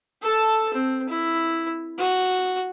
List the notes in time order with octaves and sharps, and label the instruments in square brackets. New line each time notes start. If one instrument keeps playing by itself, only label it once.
[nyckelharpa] A4 A5
C4
E4
F#4